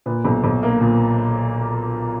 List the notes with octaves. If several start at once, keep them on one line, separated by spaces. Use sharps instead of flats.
A#2 B4
B1
B1
A#3
A#2